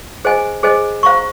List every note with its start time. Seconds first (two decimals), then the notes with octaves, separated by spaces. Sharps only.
0.25 G#4 C5 D#5 G#5
0.63 G#4 C5 D#5 G#5
1.03 C5 F5 A#5 C#6